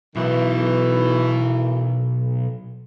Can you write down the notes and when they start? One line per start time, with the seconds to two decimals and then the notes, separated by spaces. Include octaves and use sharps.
0.16 B1 B2 D#3 E3